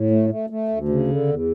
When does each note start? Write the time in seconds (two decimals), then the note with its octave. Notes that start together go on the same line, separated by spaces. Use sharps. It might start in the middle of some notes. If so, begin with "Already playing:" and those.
Already playing: A2
0.10 A3
0.30 A3
0.50 A3
0.68 D2
0.88 C#3
1.08 D3
1.27 E2